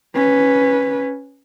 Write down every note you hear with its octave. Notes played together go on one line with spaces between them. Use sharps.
C#4 B4